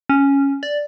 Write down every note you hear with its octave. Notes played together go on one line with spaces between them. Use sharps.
C#4
D5